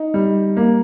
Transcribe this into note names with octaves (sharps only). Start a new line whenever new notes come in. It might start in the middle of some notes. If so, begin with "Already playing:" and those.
Already playing: D#4
G3
A#3